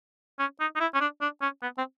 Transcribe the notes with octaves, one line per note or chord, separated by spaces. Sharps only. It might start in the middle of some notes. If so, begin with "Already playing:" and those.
C#4
D#4
D#4
E4
C#4
D4
D4
C#4
B3
C4